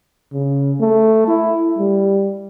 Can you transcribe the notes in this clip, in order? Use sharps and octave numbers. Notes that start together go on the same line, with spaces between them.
C#3
A3
E4
G3